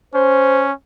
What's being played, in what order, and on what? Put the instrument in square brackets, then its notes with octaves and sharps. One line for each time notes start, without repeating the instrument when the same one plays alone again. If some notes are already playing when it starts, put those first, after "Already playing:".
[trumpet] C#4 [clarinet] C5